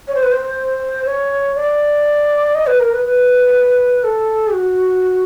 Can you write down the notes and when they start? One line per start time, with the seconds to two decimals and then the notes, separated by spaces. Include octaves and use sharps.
0.08 C#5
0.15 C5
0.23 B4
0.31 C5
1.06 C#5
1.55 D5
2.55 D#5
2.67 B4
2.80 A#4
2.92 B4
3.05 B4
4.04 A4
4.53 F#4